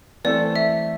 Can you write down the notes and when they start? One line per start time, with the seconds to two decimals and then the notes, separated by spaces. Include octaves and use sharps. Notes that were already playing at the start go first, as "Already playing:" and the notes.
0.24 E3 A3 C4 A4 D5
0.56 E5